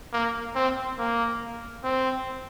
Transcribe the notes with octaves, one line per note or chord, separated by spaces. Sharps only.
A#3
C4
A#3
C4